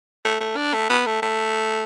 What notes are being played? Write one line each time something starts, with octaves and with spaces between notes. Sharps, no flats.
A3
A3
D4
A3
B3
A3
A3